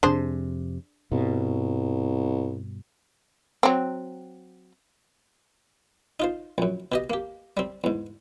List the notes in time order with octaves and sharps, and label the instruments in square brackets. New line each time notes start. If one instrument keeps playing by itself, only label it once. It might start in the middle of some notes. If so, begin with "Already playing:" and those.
[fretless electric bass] F2 C3 [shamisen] D4 G#4 C5
[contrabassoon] C2 [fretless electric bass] G2 B2
[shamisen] F#3 C4
[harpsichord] D#4 F4 C5
A#1 F#2
B2 G4 D#5
A#3 G4
G3 C4
E2 G#2